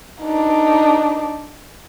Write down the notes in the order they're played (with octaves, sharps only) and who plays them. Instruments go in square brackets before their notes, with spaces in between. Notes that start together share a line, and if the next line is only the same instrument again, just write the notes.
[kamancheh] D4 D#4